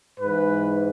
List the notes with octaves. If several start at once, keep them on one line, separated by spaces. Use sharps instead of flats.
G#2 E3 B4